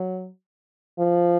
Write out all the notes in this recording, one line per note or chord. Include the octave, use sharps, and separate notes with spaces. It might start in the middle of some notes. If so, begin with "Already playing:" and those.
Already playing: F#3
F3